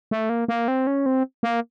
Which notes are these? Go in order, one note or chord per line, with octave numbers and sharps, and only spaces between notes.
A3
A#3
A#3
C4
C#4
C4
A#3